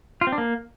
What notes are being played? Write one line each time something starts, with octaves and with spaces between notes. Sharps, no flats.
F4
C4
D4
A#3